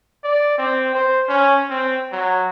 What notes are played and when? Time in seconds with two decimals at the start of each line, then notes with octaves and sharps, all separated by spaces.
0.24 D5
0.58 C4
0.95 C5
1.29 C#4
1.70 C4
2.12 F#3